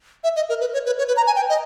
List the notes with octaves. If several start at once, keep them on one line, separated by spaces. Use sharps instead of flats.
E5
D#5
A#4
B4
C#5
B4
C#5
B4
A#5
G#5
G5
D#5